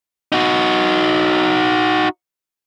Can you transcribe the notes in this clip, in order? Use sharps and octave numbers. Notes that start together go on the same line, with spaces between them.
D#4 F#4